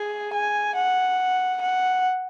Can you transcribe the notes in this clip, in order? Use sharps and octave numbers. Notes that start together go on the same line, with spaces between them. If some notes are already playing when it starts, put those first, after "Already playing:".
Already playing: G#4
G#5
F#5
F#5